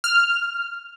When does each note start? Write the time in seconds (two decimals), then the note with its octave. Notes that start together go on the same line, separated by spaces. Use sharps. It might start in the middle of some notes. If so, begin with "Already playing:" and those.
0.04 F6